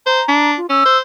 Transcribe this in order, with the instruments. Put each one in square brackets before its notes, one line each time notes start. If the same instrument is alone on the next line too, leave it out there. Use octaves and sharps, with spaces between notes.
[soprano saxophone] C5 [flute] A#5
[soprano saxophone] D4
[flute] F4
[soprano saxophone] C#4 [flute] E6
[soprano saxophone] C5